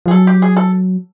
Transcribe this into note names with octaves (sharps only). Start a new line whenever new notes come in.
F3 G#4
F#3 A4
G4
G#4
A4